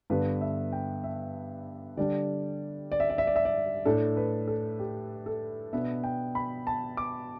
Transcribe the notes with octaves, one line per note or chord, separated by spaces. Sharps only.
G2 D3 B3 D4 B4
E5
G5
E5
D3 G3 D4 D5
D5
E5
D5
E5
D5
E5
D5
A2 A3 D4 A4
B4
A4
G4
A4
B2 B3 D4 E5
G5
B5
A5
D6